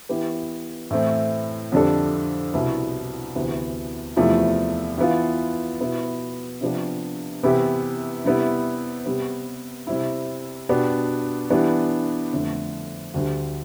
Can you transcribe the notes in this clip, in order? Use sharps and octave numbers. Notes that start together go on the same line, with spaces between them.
E3 B3 E4 G4 B4
A2 E3 A3 C4
F2 D3 G3 D4 A4
C2 B2 B3 E4
D2 C3 E3 B3
E2 C3 F3 A3 E4
E3 B3 F4
B2 B3 E4
C3 F3 B3 D4 G4
C3 E3 B3 E4 G4
C3 G3 B3 E4
C3 G3 B3
C3 G3 C4 E4
B2 B3 D4 G4
E3 G3 B3 D4
F2 D3 A3
D2 D3 G3